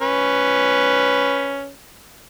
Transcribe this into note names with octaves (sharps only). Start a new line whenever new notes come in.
C#4 B4